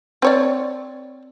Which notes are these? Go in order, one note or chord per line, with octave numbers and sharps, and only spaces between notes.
C4 C#5 D5